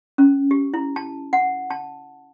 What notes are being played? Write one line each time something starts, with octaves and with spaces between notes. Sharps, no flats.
C#4
G4
E4
A5
F#5
A5